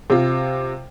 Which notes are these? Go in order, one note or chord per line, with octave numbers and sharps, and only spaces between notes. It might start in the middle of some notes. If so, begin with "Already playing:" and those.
C3 F4